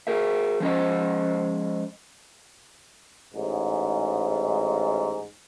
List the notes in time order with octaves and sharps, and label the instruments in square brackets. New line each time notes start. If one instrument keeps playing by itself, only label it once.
[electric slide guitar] G#4 A#4 E5
F3 G#3 C#4 C5 D#5
[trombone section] A1 G#2